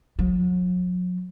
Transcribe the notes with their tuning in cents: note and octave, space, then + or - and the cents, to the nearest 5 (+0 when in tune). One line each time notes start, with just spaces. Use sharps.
F#3 -40